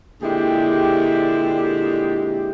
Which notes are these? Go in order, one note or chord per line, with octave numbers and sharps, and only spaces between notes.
A#2 D3 G#3 E4 G4